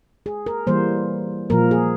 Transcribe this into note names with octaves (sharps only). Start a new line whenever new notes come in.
G#4
A#4
E3 G3 A#3 C5
A#2 F3 A#3 A#4
G#4